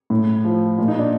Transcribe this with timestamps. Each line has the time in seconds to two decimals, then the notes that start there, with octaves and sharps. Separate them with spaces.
0.10 A2
0.45 F3
0.78 A#2 F4
0.88 D#4
0.99 D4